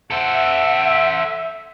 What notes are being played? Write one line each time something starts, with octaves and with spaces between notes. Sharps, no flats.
A4 C5 E5 F#5